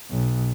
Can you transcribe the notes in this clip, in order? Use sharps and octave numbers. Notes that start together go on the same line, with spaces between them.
B1